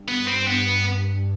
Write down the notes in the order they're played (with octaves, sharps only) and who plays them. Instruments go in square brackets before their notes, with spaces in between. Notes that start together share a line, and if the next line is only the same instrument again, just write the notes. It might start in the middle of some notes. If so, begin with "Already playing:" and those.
Already playing: [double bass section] G2
[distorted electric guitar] B3
C4
B3